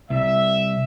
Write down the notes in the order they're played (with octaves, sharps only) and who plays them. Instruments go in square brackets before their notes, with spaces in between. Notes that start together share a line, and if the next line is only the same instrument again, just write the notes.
[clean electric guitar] C2 [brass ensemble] E5